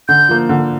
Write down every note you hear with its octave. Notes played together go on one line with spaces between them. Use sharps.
D3 G6
F3 A#3
D3